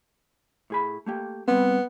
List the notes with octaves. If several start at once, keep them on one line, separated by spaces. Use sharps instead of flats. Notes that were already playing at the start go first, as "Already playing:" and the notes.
A2 G#4 B5
A3 A#3 G4
G3 B3 C4